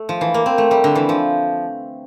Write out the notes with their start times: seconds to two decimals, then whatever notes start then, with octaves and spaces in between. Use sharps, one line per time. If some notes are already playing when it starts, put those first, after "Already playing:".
Already playing: A3
0.09 F3
0.21 E3
0.34 A#3
0.46 C4
0.58 A3
0.71 G3
0.84 D3
0.95 E3
1.09 F3